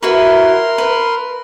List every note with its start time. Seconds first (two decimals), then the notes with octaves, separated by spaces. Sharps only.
0.03 E4 F#4 A#4 B4 C6
0.78 B4